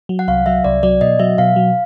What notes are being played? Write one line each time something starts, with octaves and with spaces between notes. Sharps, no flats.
F#3
F#5
C2 F5
F#3 E5
C2 D5
F#3 D5
B2 D#5
F#3 E5
B2 F5
F#3